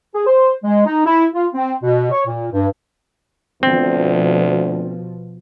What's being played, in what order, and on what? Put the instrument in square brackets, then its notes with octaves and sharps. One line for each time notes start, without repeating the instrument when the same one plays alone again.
[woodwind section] G#4
C5
G#3
D#4
E4
F4
C4
B2
C#5
A#2
G2
[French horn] D2 [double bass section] B2 F3 [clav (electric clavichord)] C4